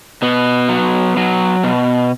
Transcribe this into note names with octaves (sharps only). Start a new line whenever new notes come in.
B2 B3
F#3
F#3
B2